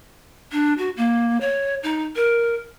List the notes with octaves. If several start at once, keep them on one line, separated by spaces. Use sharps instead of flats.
D4
F#4
A#3
C#5
D#4
A#4